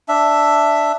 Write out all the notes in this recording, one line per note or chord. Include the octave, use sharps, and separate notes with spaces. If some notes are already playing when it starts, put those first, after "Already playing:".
D4 E5